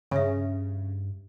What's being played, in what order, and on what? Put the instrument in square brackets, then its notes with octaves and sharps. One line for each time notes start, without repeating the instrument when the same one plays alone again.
[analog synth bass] G2 [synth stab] C#3 [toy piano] E5 G#5